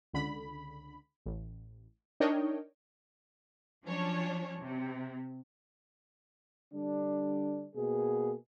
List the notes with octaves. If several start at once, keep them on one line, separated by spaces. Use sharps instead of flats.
C#2 D3 B5
A1
D4 D#4 A#4 C#5 D#5 G5
F3 F#3 C#4 D4 C#5
C3
D3 G3 D4
B2 A#3 G#4